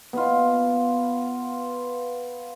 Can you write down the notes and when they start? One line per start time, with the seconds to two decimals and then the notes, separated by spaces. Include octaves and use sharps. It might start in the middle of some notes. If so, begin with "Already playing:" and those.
0.13 B3 F4